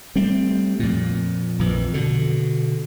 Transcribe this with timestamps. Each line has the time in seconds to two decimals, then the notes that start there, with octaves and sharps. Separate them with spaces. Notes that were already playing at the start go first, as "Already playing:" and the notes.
0.16 G3 A3 C4
0.80 F2 A#2
1.59 A#1 F2 E3
1.94 B2 D3